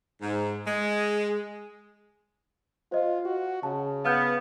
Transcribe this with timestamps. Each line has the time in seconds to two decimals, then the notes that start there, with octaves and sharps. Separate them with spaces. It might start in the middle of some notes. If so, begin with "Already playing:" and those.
0.21 G#2
0.66 G#3
2.92 F4 C5 D#5
3.25 F#4
3.63 C#3 A5
4.05 B3 F5 F6 G6